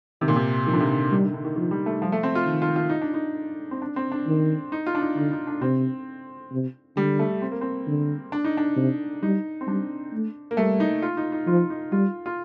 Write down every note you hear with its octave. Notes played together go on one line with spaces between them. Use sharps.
C3 D#3
A#2
C3
D#3 F3
D3
C3
D3
D#3 G3
D3
D3
D#3
D#3 F3
G3
A3
F3 G3
A3
C4
F4
D#3
F4
F4
D#4
D4
D#4
C4
D4
C4
D4
D#3
D#4
F4
D4
D#4
D3 D#4
D#4
D4
C3 C4
C3
D3 G3
A3
C4
A#3
C4
D3
D4
D#4
D4
C3
G3 D#4
C4
G3 D4
A3
A#3
G3 A3
D#4
F4
D#4
D#4
F3 F4
D#4
G3 F4
F4